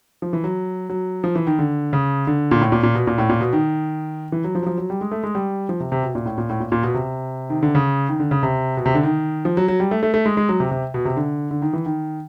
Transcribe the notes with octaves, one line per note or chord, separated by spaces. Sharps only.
F3
E3
F#3
F#3
F3
E3
D#3
D3
C#3
D3
A#2
A2
A#2
A#2
B2
A#2
A2
A#2
B2
D#3
E3
F#3
F3
F#3
F3
F#3
G3
G#3
A3
G#3
G3
F3
C3
C3
B2
A#2
A2
A#2
A2
A#2
A#2
B2
C3
D#3
D3
C#3
D#3
D3
C#3
C3
B2
C3
D3
D#3
F3
F#3
F#3
G3
A3
A3
A3
G#3
G#3
F#3
C3
C3
B2
C3
D3
D3
D#3
E3
D#3